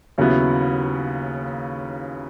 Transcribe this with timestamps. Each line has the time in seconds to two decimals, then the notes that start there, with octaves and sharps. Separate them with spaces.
0.18 D#2 C#3 F#3 B3 E4